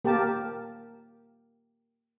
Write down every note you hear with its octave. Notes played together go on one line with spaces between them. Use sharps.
A#3 G4 A#4 A5